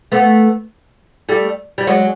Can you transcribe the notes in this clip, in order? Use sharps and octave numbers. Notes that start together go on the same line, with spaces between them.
A3 B3
G3 A3
G3
F#3 G#3